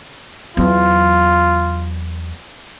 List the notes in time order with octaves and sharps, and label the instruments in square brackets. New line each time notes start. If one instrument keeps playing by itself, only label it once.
[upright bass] E2 F#3 [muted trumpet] F4